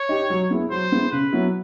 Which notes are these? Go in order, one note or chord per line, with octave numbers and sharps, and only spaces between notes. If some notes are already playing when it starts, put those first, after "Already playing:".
Already playing: C#5
D#4 G4
F#3
B3 E4 G#4
F#3 C5
B3 E4 G#4
C#3 B4
F#3 B3 E4